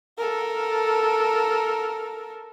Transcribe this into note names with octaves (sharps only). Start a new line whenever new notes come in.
A4 A#4